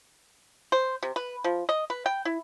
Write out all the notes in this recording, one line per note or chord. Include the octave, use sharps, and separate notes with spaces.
C5
C3
B4
F3
D#5
B4
G5
E4